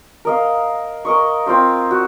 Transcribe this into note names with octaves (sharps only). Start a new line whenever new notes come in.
A#4 D#5 F5
A#4 D#5 C#6
C4 F4 A#4 C5
F#4